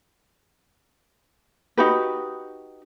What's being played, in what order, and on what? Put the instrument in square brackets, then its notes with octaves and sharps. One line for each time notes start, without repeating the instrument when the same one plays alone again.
[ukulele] D#4 F#4 G4 B4